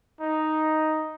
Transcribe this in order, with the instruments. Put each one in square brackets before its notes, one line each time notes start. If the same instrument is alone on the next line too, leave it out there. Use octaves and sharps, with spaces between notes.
[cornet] D#4